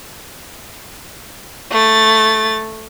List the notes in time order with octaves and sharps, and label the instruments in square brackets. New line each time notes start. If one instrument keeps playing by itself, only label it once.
[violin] A3 A6